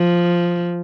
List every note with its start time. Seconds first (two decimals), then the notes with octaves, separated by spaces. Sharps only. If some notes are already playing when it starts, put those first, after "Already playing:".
Already playing: F3